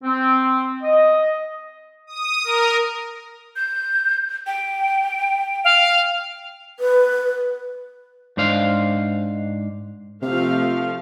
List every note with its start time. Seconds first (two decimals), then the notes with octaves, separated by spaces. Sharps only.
0.04 C4
0.83 D#5
2.07 D#6
2.44 A#4
3.56 G6
4.47 G5
5.65 F5
6.80 B4
8.37 G#2 D4 C5 F5
10.22 C3 F3 A3 F5